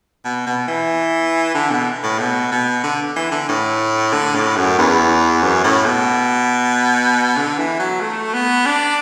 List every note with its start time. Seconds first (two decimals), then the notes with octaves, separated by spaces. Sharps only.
0.25 B2
0.47 B2
0.68 E3
1.55 D3
1.71 B2
2.03 A2
2.19 B2
2.52 B2
2.83 D3
3.16 E3
3.32 D3
3.49 A2
4.13 D3
4.35 A2
4.56 F#2
4.78 E2
5.43 F#2
5.64 A2
5.85 B2
7.37 D3
7.58 E3
7.79 F#3
8.01 A3
8.34 B3
8.66 D4